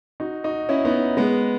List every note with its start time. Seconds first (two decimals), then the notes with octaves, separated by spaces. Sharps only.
0.20 D#4 F#4
0.44 D#4 F#4
0.69 C#4 E4
0.85 B3 D#4
1.17 G#3 B3